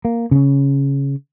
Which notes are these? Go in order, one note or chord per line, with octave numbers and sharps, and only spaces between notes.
A#3
C#3 C#4